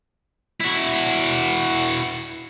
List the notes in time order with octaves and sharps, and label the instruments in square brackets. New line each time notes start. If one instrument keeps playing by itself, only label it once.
[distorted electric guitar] E4 F#4